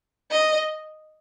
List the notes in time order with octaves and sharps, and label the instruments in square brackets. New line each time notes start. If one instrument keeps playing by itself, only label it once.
[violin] D#5